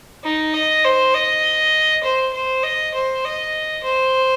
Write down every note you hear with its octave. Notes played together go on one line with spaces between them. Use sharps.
D#4
D#5
C5
D#5
C5
C5
D#5
C5
D#5
C5